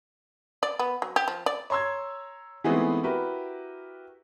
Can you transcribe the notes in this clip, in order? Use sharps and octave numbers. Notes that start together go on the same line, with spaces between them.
D5
B3
F#3
G4
F3
D5
C#5 A#5 C6 E6 G#6
E3 G#3 A3 B3 C4 D#4
E4 F#4 G4 A#4 B4